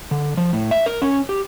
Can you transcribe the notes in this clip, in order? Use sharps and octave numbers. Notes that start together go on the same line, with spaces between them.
D3
F3
A2
E5
A#4
C#4
G4